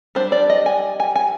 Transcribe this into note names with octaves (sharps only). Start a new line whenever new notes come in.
G3 D4 C5
D5
D#5
G#5
G#5
G#5